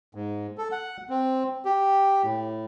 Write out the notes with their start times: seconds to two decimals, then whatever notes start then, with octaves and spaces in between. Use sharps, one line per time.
0.15 G#2
0.58 A4
0.72 F#5
1.09 C4
1.65 G4
2.24 A2